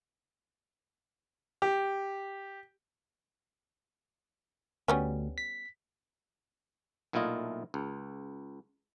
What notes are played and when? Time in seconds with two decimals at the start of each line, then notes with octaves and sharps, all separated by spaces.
1.62 G4
4.88 D2 G3 B3 C#4
5.38 B6
7.13 B1 A#2 A3 E4 F4 D#5
7.74 C#2